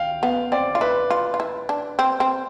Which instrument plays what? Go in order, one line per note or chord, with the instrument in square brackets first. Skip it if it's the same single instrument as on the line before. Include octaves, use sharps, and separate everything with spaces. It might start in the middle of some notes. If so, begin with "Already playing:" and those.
Already playing: [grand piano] F5 G5
[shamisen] B3 [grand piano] F5
[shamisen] C4 [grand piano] D5
[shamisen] F4
[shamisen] E4 [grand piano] B4
[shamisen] F4
F4
E4
D4
C4
C4